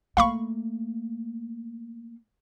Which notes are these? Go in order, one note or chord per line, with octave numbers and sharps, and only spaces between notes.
A3 A#3 F5 B5 C#6